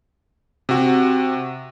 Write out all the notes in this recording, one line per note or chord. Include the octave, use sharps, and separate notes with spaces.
C3 F#4